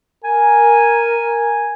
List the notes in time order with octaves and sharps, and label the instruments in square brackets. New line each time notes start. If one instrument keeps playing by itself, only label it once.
[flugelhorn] A#4 [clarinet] G#5